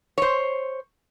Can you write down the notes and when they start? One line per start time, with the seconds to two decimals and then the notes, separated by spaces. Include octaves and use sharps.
0.18 C5 C#5